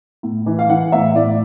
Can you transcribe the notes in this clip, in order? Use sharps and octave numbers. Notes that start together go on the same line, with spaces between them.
A2
E3
F5
E3 F#5
A2 E5
A2 D5